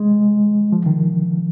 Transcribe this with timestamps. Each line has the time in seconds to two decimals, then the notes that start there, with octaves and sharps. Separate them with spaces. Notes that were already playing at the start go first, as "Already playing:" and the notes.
Already playing: G#3
0.72 F3
0.86 D#3